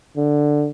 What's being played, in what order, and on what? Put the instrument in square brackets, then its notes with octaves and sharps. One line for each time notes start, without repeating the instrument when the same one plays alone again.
[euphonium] D3